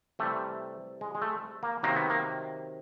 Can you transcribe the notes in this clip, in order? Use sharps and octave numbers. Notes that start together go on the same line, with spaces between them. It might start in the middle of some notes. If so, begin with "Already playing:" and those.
C3 E3 G3 A3
G#3
G#3
A3
A#3
C3 D#3 F#3 A#3
B3
A#3